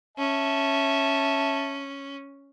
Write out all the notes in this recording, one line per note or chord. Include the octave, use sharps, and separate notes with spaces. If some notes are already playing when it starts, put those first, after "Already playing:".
C#4 E5 A5